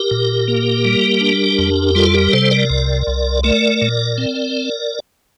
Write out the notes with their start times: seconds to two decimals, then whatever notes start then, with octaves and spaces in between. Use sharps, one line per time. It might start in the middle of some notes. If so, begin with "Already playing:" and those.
Already playing: G4 A#4
0.11 A#2
0.48 A#3
0.85 G3
1.21 D4
1.58 F2
1.95 G3 F4 A4
2.14 G4 A#4
2.32 C3 A4 C5
2.51 A#4 D5
2.70 C2
3.07 C2
3.43 A3 A#4 D5
3.81 A#2
4.18 C4